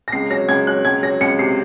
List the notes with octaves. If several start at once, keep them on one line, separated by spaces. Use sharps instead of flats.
A#6
C#2 C7
F#3 A#6
C#2 G#6
F#3 F#6
C#2 G#6
F#3 A#6
C#2 C#7
C3 C7